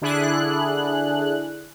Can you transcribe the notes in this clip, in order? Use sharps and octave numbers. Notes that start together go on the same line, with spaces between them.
D3 D4 E4 G#4 F#6